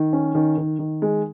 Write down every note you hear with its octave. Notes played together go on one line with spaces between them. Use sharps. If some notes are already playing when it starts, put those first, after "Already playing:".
Already playing: D#3
C#4
D#3
D#3
D#3
G#3